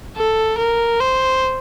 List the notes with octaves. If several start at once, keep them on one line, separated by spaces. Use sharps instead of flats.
A4
A#4
C5